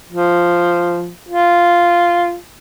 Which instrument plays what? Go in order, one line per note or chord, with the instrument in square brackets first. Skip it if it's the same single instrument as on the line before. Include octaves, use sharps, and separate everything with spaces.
[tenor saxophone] F3
F4